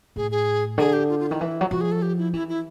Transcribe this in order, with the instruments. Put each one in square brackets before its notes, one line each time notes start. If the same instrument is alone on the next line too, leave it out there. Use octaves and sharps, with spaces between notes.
[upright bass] A2 [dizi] G#4
[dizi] G#4
[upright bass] D3 [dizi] G#4
[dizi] G4
F4
F4
[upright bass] D#3 [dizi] E4
[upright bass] E3
F#3
[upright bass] F3 [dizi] F#4
[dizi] G#4
A4
G4
E4
[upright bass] E3 [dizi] E4
[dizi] E4